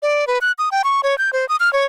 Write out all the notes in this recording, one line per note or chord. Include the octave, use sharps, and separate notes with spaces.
D5
B4
F#6
D#6
G5
C#6
C#5
G6
C5
D#6
F6
C#5